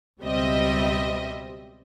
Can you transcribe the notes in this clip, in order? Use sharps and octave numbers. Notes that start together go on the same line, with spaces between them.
C#2 B2 G3 C4 D#5 E5